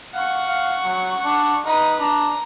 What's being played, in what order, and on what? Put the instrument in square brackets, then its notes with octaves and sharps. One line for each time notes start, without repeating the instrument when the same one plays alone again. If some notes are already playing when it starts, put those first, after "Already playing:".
[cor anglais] F5 [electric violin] F#5 C#6
[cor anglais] F5
F#3
D4
[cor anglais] D#4 [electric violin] B4 D#6
[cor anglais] D4 [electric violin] A#5